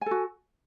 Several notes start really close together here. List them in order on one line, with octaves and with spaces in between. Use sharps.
G#5 A4 F#4